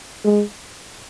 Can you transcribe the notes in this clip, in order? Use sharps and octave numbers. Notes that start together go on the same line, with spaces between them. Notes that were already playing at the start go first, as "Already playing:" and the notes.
G#3